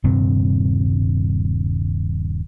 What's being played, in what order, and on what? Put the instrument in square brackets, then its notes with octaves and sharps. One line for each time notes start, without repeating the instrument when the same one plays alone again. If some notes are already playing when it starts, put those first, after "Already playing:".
[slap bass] D#1 G2 C3 C4